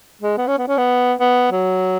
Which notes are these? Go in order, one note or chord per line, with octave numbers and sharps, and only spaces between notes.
G#3
B3
C#4
B3
C#4
B3
B3
F#3